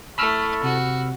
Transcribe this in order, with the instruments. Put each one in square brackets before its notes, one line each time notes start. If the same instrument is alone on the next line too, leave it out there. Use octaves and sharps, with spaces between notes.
[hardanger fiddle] A3 [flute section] E4 A4 C#6 [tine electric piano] B5 E6 F6
[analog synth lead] C3 [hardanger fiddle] F#4